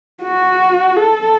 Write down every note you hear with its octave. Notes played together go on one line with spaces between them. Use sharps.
F#4
A4